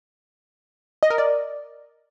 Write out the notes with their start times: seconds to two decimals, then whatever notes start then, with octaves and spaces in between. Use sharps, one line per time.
1.03 D#5
1.10 A#4
1.18 D5